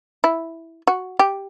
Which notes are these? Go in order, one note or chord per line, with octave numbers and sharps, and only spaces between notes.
E4
F#4
G4